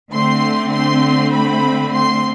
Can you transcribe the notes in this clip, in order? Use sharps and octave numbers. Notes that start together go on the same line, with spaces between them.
D3 A3 C4 C6
C6
B5
C6